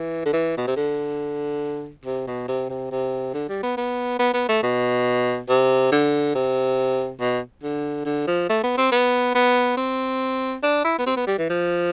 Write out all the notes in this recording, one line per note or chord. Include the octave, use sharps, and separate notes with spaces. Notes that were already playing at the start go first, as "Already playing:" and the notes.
Already playing: E3
D3
E3
B2
C3
D3
C3
B2
C3
C3
C3
D3
G3
B3
B3
B3
B3
A3
B2
C3
D3
C3
B2
D3
D3
F3
A3
B3
C4
B3
B3
C4
D4
E4
B3
C4
B3
G3
E3
F3